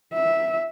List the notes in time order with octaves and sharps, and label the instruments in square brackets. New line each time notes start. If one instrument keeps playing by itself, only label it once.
[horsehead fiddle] E5